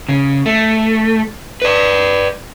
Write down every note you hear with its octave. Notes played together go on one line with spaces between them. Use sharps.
C#3
A3
B4 D5